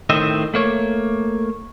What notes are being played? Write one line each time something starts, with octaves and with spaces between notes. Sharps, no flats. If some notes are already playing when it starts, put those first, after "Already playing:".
A2 D#3 C4 D#5 E5
A3 A#3 C#5